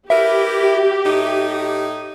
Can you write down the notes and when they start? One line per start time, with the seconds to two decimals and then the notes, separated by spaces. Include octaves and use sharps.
0.10 E4 G4 A#4 B4 E5
1.05 A2 D#4